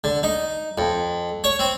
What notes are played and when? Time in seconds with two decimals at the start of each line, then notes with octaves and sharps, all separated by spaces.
0.04 D3
0.23 D#4
0.78 F2
1.44 C#5
1.59 C4